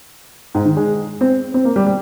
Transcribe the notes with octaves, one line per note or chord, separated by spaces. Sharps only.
G#2
D#3
G#3
C4
C4
A#3
G3
G3